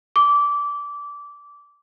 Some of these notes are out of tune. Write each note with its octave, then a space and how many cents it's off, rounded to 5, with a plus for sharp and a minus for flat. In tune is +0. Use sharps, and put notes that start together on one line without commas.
D6 -20